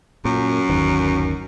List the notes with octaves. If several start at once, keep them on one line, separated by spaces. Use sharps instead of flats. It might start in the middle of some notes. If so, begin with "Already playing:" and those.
F#2 A#2
G1 D#2 D#3